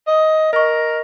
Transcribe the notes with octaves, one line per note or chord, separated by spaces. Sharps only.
D#5
A#4 D#5 C#6